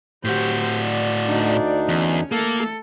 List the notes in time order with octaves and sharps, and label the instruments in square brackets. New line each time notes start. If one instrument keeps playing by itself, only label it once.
[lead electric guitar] A2 F#4 [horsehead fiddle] G4 C5
[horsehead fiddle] D5
[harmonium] D2 D4 D#4
[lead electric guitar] E2 [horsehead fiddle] C#4
[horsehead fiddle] A3 A4 [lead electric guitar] A#3